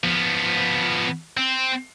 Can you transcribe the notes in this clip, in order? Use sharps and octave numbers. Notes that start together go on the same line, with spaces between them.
F3 B3
C4